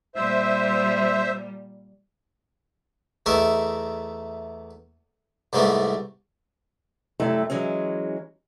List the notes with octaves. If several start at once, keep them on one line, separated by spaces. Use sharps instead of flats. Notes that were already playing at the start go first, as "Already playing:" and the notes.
A#2 G3 C5 E5
E2 A3 D#4 A#4 E5
C2 G#2 G3 A3 B3
F#2 C3 G3 A3 E4
E3 F#3 G#3 C#4